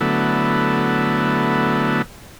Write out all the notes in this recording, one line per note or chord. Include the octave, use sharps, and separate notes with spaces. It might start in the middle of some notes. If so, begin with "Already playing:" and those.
D3 F#3 A3 B3 E4